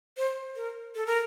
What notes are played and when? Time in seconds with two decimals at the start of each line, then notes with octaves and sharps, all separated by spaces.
0.17 C5
0.56 A#4
0.95 A4
1.06 A#4